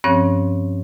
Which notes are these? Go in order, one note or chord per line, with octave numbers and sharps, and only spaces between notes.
G2 F3 C4 C#4 C#5 F#6